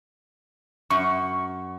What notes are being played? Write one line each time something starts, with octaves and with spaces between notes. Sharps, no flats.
F#2 C#6